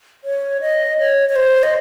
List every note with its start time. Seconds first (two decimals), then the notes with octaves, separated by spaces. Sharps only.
0.24 C#5
0.61 D#5
0.99 C#5
1.29 C#5
1.36 C5
1.63 D#5